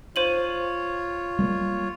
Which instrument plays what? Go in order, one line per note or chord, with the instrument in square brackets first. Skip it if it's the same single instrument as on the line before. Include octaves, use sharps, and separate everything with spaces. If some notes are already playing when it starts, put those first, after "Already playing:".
[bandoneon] F4 C#5 [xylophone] C5 D#7 F#7
[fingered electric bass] G3 A3 A#3